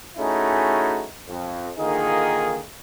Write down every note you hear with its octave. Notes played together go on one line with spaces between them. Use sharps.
A3 C#4 D#4 E4 F#4 G#4
F2
D3 D#3 A#3 D#4 F4 G#4